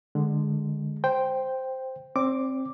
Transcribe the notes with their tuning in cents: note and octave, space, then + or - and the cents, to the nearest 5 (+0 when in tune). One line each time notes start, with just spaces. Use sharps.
D3 +20 G#3 +0
C5 +0 G5 +0
C4 +15 D5 -30 D6 +0